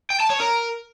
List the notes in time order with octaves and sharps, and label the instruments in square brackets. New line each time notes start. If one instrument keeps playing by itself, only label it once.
[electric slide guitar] G5
A5
C#5
A#4